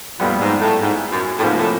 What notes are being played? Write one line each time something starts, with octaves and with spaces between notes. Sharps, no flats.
F2 A#2 G3 B3
G#2
A2
G#2
F#2
A2
G#2 C3 F3 A#3
A2